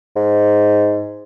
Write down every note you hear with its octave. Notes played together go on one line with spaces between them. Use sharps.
G#2